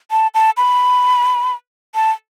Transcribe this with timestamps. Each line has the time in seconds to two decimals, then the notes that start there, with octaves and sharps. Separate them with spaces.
0.11 A5
0.34 A5
0.57 B5
1.95 A5